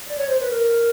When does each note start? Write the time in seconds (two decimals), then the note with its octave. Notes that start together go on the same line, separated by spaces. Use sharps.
0.07 D5
0.18 C#5
0.28 C5
0.39 B4
0.49 A#4